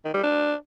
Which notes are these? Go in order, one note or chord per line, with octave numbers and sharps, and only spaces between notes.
D#3
G3
D4